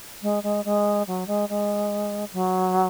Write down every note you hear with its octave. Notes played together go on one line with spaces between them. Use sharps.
G#3
G#3
G#3
F#3
G#3
G#3
F#3